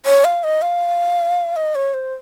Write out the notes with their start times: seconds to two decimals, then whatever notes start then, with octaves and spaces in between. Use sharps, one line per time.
0.06 C#5
0.25 F5
0.44 D#5
0.62 F5
1.56 D#5
1.75 C#5
1.94 C5